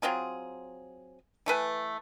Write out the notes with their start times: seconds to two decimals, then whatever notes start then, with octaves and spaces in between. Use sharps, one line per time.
0.02 F#3 C4 F4 G#4
1.46 E3 A3 B4 G#5